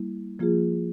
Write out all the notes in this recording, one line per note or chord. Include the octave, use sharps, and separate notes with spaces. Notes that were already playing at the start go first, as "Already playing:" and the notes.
Already playing: G3 A#3 E4
F3 A#3 F4 G#4